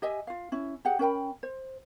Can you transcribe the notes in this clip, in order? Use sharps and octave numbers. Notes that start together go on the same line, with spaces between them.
G4 D#5 E5 G#5
F4 F5
C#4 E4
G4 G#4 F#5
C#4 A#4 G5 B5
C5